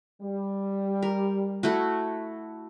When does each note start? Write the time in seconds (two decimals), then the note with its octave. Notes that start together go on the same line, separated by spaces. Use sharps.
0.22 G3
1.02 A#4
1.63 A3 E4 F#4